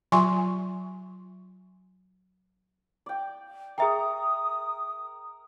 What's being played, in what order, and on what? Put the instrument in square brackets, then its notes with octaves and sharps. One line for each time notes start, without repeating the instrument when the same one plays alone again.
[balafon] F#3 F4 E5 G#5 C6 C#6
[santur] D5 G5
[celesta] G#4 E5 G5 [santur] A#4 D#5 A#5 [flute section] D#6